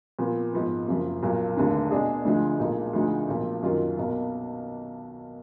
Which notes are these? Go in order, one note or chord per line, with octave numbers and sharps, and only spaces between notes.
A#2 F3 B3
G#2 F3 B3
F#1 F#2 F3
B1 A#2 F#3 A#3
F1 D#2 D3 G#3
B2 G#3 D4 G#4
D2 D3 F3 G#3
B1 A#2 G#3 D#4
D2 D3 F3 G#3 D#4
B1 A#2 F3
F#2 D#3 F#3 A#3 F4
B1 B2 A#3